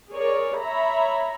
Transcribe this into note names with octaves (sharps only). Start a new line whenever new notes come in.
G#4 A#4 C#5 D5
C#5 E5 A#5 B5